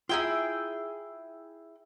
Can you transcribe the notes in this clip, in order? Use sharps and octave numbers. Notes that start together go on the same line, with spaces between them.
E4 F4 G#4 E5 G5 A#5